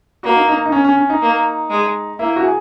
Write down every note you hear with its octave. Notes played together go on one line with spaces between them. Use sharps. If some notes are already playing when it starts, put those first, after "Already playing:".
A#3 F#4
D#4
D#4
D#4
C#4
C#4
C#4
D#4
A#3
G#3
A#3 E4
F#4
G#4